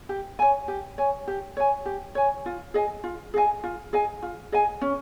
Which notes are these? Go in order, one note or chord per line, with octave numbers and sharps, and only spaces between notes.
G4
C#5 G#5
G4
C#5 G#5
G4
C#5 G#5
G4
C#5 G#5
F4
G#4 D#5 G#5
F4
G#4 D#5 G#5
F4
G#4 D#5 G#5
F4
G#4 D#5 G#5
C#4